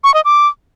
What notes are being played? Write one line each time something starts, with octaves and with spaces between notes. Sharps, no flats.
C#6
D#5
D6